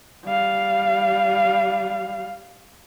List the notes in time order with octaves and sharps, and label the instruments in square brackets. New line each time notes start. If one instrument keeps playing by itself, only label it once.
[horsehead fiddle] G3 F5